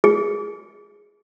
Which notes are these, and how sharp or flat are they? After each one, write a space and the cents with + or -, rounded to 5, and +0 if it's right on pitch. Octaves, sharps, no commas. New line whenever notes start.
G#4 -10